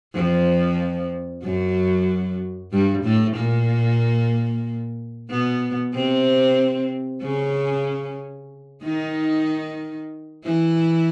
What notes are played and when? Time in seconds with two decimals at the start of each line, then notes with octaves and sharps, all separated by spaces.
0.14 F2 F3
1.44 F#2 F#3
2.72 G2 G3
3.04 A2 A3
3.37 A#2 A#3
5.30 B2 B3
5.94 C3 C4
7.23 C#3 C#4
8.84 D#3 D#4
10.45 E3 E4